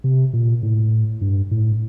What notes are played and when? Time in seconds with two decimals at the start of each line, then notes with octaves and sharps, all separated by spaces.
0.04 C3
0.33 A#2
0.63 A2
1.21 G2
1.51 A2